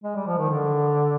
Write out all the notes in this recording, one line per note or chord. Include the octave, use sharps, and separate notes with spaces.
G#3
G3
F3
D#3
D3